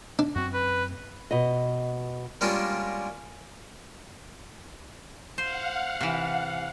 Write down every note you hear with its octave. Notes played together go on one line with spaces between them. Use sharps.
D4
F#2 C4 F#4
B4
B2 D#5
G3 G#3 A#3 C#4 D4 F4
C5 F5 F#5
C3 E3